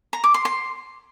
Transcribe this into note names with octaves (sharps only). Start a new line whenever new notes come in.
A#5
D6
C6
C6